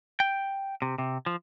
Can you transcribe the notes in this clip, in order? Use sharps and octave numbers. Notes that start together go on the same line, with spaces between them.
G5
C3
C3
F3